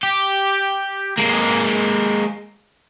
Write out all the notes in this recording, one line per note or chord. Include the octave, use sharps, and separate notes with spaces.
G4
G#3 A#3